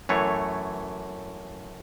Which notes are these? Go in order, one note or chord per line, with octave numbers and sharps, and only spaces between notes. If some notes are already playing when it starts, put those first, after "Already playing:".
F#2 E3 A3 C#5